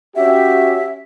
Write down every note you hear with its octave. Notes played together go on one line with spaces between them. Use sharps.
C#4 F#4 G4 E5